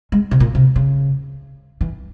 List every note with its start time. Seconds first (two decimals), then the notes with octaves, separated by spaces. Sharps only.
0.12 G#3
0.31 C3
0.40 A#2
0.55 C3
0.76 C#3
1.81 E3